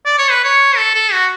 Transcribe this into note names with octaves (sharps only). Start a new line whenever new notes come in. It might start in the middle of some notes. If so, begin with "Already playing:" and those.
D5
C#5
B4
C#5
A4
A4
F#4